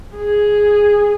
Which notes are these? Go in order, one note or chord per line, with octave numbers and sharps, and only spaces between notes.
G#4